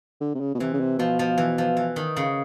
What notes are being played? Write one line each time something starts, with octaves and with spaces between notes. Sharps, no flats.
D3
C3
C#3
B2
C3 E3
C#3
C3
B2 F3
F3
E3
F3
E3
D#3
C#3